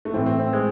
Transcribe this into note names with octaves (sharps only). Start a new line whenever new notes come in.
A3
A2 E3 C4
C4
C4
G#3